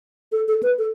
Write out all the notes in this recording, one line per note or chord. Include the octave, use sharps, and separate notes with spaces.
A4
A4
B4
A4